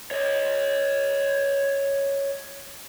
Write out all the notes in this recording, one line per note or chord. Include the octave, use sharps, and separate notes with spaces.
C#5 D#5